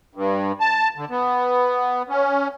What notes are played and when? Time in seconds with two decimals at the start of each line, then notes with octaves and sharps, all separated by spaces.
0.15 G2
0.61 A5
0.97 D3
1.10 B3
2.09 C#4